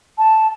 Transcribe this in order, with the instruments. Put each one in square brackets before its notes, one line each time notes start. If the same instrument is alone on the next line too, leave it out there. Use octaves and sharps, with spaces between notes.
[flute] A5